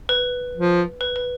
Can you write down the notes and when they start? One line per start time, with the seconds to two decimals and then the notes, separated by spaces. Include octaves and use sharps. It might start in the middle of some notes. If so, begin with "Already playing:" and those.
0.09 B4
0.55 F3
1.01 B4
1.16 B4